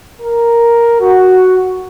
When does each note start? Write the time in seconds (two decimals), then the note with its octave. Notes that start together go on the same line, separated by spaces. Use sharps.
0.20 A#4
1.01 F#4